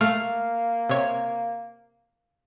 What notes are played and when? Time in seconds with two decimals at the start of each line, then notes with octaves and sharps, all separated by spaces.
0.01 A3 A#3 F5
0.90 C3 C#5